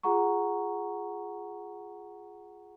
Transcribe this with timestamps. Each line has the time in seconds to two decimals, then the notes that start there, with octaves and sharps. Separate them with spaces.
0.03 F4 G#4 F#5 A#5 C#6